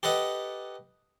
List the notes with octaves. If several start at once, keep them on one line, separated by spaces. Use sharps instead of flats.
G4 A4 B4 D#5 F#5